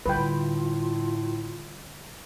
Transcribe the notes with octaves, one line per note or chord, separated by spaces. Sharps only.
A2 D3 G3 F4 B4 G5